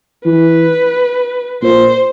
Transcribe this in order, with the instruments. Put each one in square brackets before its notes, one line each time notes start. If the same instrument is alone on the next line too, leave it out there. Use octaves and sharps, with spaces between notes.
[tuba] E3 [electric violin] B4
[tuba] A#2 [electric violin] C5